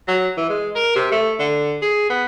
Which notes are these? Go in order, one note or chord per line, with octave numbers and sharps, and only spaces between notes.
F#3
E3
G#3
A#4
C3
A3
D3
G#4
B3